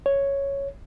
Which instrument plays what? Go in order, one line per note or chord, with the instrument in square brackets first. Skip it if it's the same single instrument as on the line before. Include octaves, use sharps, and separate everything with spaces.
[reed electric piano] C#5